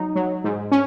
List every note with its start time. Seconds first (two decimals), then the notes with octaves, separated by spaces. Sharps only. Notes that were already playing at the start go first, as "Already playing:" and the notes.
Already playing: F#3 D#4
0.16 F#3
0.44 G#2
0.72 C#4